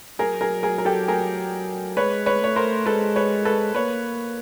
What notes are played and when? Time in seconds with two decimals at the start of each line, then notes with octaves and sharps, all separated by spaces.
0.19 F#3 G#4 A#4
0.41 G#4 A#4
0.63 G#4 A#4
0.78 A#4
0.85 G4 A4
1.08 G#4 A#4
1.97 G#3 B4 C#5
2.26 B4 C#5
2.42 A3 C#5
2.56 A#4 C5
2.86 G#3 A4 B4
3.16 B4 C#5
3.45 A4 B4
3.75 A#3 B4 C#5